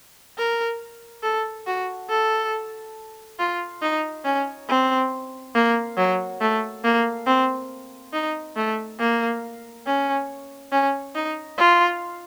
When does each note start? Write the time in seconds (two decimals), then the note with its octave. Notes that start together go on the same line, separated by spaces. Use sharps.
0.38 A#4
1.23 A4
1.67 F#4
2.10 A4
3.39 F4
3.82 D#4
4.25 C#4
4.69 C4
5.55 A#3
5.97 F#3
6.41 A3
6.84 A#3
7.27 C4
8.13 D#4
8.56 A3
8.99 A#3
9.86 C#4
10.72 C#4
11.15 D#4
11.58 F4